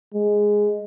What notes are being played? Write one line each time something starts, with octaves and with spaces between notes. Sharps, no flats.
G#3